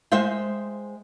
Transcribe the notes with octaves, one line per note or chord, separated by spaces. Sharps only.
G#3 C5 E5 F5 G5